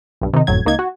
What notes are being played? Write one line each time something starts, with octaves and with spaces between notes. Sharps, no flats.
B1 G2
C3 D#3 D#4
G1 F2 A2 F#3 G#6
C#2 A#3 D#4 G#6
F#4